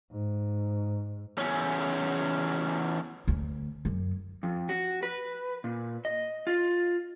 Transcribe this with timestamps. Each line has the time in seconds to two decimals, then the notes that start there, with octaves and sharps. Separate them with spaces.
0.12 G#2
1.39 E2 C#4
3.28 D2
3.85 F#2
4.43 F2
4.69 F#4
5.03 B4
5.64 A#2
6.05 D#5
6.47 F4